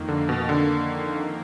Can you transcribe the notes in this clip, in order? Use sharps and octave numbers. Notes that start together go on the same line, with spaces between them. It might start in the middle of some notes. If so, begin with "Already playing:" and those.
Already playing: F2 D#3 A#3
D3
B2
D3